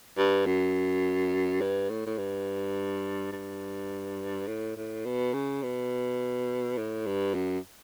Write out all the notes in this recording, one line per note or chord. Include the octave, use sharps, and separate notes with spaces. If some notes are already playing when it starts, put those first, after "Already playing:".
G2
F#2
G2
A2
A2
G2
G2
A2
A2
B2
C#3
B2
A2
G2
F#2